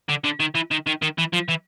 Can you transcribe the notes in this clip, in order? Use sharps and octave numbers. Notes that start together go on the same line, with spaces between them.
D3
D3
D#3
E3
D#3
D#3
D#3
E3
F3
E3